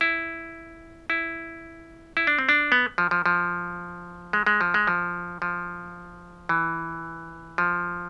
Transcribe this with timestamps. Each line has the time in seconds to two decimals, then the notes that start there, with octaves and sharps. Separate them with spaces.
0.01 E4
1.10 E4
2.17 E4
2.27 D4
2.39 C4
2.49 D4
2.72 B3
2.98 F3
3.11 F3
3.26 F3
4.33 G#3
4.46 G#3
4.61 F3
4.74 G#3
4.87 F3
5.42 F3
6.49 E3
7.58 F3